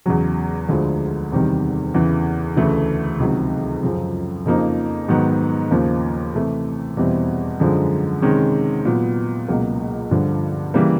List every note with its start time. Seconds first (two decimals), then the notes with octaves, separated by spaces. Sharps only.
0.06 E2 C#3 F#3
0.69 D2 D3 F3 G#3
1.32 E2 C3 D#3 G3
1.94 E2 C#3 E3
2.57 D2 C#3 E3 A3
3.20 C#2 C3 D#3 F#3
3.83 F#2 C#3 F3
4.45 F2 C#3 F3 A#3 D#4
5.08 G#2 D#3 F#3 B3
5.71 D#2 C#3 F3 A#3
6.34 C3 E3 A3
6.97 E2 B2 G3 C4 E4
7.60 F#2 D3 F3 G#3
8.22 C3 D#3 G#3 C#4
8.85 A#2 F#3 B3
9.48 C#2 B2 F#3 A#3
10.11 G2 D3 F3
10.74 C#3 E3 G3 A#3